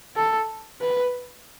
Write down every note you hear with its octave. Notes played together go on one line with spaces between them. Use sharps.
A4
B4